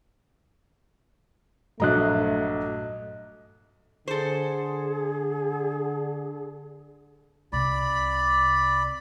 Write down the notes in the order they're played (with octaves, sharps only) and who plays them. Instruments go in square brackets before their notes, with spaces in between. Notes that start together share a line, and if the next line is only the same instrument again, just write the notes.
[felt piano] A#1 F#3 A#5 [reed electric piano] G2 D#5 F#6 [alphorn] A3
[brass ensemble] D3 [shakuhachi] G#4 [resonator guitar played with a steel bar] A4 C5
[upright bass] C2 C3 [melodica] D5 B5